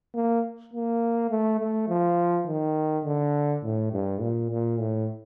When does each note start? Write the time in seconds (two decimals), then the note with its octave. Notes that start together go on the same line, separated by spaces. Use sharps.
0.14 A#3
0.73 A#3
1.30 A3
1.60 A3
1.89 F3
2.47 D#3
3.05 D3
3.63 A2
3.92 G2
4.21 A#2
4.51 A#2
4.80 A2